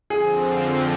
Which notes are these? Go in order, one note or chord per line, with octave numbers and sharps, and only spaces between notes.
F2 D3 F3 C4 G#4